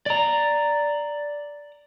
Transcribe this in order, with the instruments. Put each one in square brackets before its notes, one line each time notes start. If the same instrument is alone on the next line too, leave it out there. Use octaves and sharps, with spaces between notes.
[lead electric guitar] D5 A#5